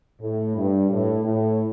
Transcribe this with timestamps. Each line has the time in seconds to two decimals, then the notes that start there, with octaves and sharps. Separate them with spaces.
0.21 A2
0.56 G2
0.91 A2
1.24 A2